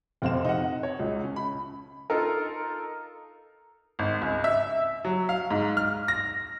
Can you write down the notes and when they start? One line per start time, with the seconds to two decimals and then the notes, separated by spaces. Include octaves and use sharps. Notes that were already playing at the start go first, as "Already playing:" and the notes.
0.22 F1 C4 F5 E7
0.45 D#4 F#5
0.83 C#5
0.99 C#2
1.23 C#4
1.36 B5
2.10 D#4 F4 A4 A#4
3.99 G#1
4.22 C#2
4.44 E5
5.05 F#3
5.29 F5
5.51 G#2
5.77 F6
6.08 A#6